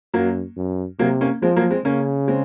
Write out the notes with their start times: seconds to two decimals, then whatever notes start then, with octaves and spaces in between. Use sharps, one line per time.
0.14 F#2 F#3 A#3
0.57 F#2
0.99 C3 F#3 A#3
1.21 A#3 C#4
1.42 F3 G#3 C4
1.56 F#3 A#3
1.71 G#3 C4
1.85 C#3 A#3 C#4
2.28 G#3 C4